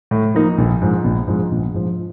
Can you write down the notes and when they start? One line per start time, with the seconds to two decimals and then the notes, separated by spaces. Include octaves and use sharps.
0.11 A2
0.34 F3 A#3 D#4
0.58 A#1
0.82 G#2 F3
1.04 A#1
1.28 G#2 F3
1.51 A#1
1.74 G#2 F3